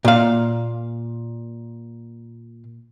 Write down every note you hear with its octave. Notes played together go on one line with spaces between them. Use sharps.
A#2 F5